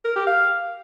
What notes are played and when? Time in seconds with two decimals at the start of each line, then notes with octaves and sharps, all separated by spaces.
0.04 A#4
0.16 G4
0.27 F5